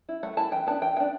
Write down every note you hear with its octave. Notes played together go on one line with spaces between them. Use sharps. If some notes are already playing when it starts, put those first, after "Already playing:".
E4
A3 F#5
E4 A5
E3 G5
B3 D4 A5
E3 G5
B3 D4 G5